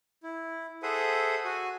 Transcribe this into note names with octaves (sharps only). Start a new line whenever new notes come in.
E4
G#4 A4 C5 E5 F#5 D#6
F#4 G#5